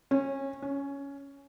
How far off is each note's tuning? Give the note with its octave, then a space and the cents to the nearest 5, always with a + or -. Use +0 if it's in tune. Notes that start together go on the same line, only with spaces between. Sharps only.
C#4 -20
C#4 +10